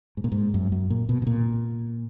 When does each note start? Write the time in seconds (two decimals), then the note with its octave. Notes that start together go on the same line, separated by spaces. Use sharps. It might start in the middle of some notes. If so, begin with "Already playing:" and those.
0.17 G#2
0.24 A#2
0.32 G#2
0.54 F#2
0.72 F#2
0.90 A#2
1.09 B2
1.22 B2
1.27 A#2